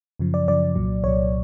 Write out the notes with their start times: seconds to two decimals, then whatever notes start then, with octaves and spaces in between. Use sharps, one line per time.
0.19 F#2 C#3 F3
0.34 D5
0.48 F#2 C#3 F3 D5
0.75 C2 A#2 F#3
1.03 C2 A#2 F#3 C#5